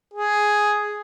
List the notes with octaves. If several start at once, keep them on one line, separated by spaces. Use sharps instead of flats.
G#4